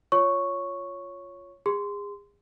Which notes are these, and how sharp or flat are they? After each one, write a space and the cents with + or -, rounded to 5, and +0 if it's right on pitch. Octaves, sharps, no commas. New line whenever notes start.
F4 +0 C#5 +0 C#6 +0
G#4 -35 C6 -15